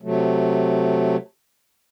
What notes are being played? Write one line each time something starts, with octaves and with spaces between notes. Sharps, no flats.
C3 F#3 A3